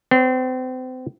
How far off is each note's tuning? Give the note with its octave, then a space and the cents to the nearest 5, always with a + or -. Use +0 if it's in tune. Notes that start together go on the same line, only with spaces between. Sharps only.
C4 -35 C#5 +0